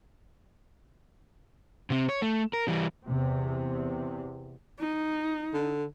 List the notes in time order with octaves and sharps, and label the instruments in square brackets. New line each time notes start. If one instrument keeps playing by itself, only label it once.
[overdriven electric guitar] C3 C4
C#5
A3
A#4
E3 G3
[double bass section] E2 C3
[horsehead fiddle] D#4
[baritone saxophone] D3